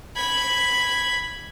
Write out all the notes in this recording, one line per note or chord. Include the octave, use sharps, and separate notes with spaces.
B5 G#6